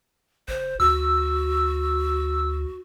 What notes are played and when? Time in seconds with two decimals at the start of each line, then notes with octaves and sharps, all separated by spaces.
0.48 F#1 C5
0.80 D2 F#4 E6